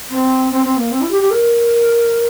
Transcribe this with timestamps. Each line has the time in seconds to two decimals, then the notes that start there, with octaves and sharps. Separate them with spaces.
0.10 C4
0.51 C4
0.64 C4
0.77 A#3
0.91 C4
1.01 E4
1.11 G4
1.21 G4
1.31 A#4